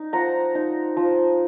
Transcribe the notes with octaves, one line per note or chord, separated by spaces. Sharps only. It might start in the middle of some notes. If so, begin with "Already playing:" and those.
Already playing: D#4
F3 F#5 A#5
D#4
F3